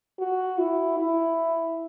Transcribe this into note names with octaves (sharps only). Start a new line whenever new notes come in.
F#4
E4
E4